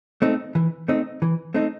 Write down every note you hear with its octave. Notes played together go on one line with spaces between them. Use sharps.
A3 C4 D#4
E3
A3 C4 D#4
E3
A3 C4 D#4